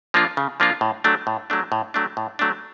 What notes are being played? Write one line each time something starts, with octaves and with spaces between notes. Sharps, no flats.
F3 A#3 D4 F4
C#3
F3 A#3 D4 F4
A2
F#3 A3 D4
A2
F#3 A3 D4
A2
F#3 A3 D4
A2
F#3 A3 D4